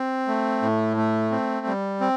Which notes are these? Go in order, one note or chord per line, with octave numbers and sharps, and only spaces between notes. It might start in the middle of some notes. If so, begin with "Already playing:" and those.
Already playing: C4
A3
A2
A3
C4
G3
C4